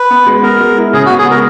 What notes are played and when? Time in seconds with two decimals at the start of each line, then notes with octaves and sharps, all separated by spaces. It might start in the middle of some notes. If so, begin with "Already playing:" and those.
Already playing: B4
0.10 B3
0.27 G#3
0.43 B3 A#4
0.61 G#3
0.77 E4
0.93 C#3 G#4
1.06 B3 F#4
1.18 G#4
1.27 G#3 A#4